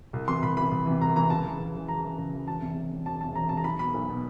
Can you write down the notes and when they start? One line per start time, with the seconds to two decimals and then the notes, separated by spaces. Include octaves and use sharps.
0.13 C2
0.28 C3 E3 C6
0.42 C2 B5
0.57 C3 E3 B5
0.71 C2
0.86 C3 E3
1.01 C2 A#5
1.16 C3 E3 A#5
1.30 C#2 A5
1.45 C#3 E3
1.59 C#2
1.74 C#3 E3
1.88 C#2 A#5
2.03 C#3 E3
2.18 C#2
2.33 C#3 E3
2.47 E1 A5
2.62 E2 C3
2.77 E1
2.92 E2 C3
3.06 E1 A5
3.21 E2 C3 A5
3.35 E1 A#5
3.49 E2 C3 A5
3.57 A#5
3.64 B1 B5
3.79 B2 B5
3.94 B1
4.09 B2